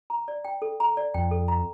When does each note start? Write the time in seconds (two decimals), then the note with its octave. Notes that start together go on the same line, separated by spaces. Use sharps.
0.10 A#5
0.28 D5
0.45 G5
0.62 A4
0.80 A#5
0.97 D5
1.14 F2 G5
1.31 A4
1.48 A#5